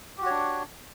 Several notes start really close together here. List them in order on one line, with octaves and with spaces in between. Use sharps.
G4 F#4 C#5 D4